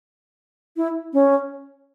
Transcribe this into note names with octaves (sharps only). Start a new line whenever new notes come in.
E4
C#4